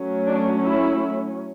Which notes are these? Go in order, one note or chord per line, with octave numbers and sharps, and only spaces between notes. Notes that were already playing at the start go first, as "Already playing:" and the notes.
Already playing: F#3 A3 C#4
D4
E4